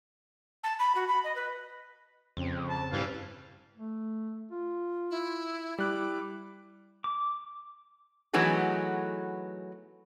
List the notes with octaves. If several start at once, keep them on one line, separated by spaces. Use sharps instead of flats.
A5
B5
F#4
B5
D#5
B4
F2 C#3 C4
A5
G2 E3 G3 F5
A3
F4
E4
G3 E4 D6 F#6
D6
E3 F#3 A3 B3 D#4 G#4